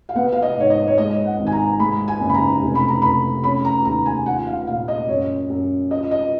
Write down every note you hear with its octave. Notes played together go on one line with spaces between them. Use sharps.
F5
B3 F#5
F5
D#5
G#2 C#5
D#5
C#5
G#3 D#5
F#5
G#1
G#5
A#5
G#3 B5
G#5
F#1
B5
A#5
F1
B5
A#5
F1 B5
C#4 B5
A#5
D#2 A#5
G#5
F4 F#5
F5
A#2 F5
D#5
F#2 C#5
F#2
F4 D#5
D#5